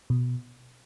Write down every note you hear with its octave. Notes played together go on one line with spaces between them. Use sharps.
B2